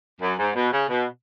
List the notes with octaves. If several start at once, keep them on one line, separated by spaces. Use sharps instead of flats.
F#2
G#2
B2
C#3
B2